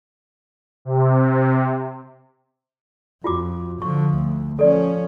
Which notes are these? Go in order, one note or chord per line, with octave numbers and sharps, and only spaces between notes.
C3
F2 F4 F#4 D6
D3 F3 C#6
D2
F3 C#4 A4 D5